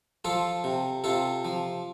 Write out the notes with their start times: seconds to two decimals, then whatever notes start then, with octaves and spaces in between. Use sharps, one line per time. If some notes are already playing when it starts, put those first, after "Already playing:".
0.25 F3 F4 A4
0.64 C3
1.04 C3 F4 A4
1.45 F3